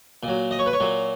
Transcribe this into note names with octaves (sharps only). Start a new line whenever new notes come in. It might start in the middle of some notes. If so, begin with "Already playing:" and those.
A#2
F#3
D#5
C#5
B4
C#5
A#2 F#3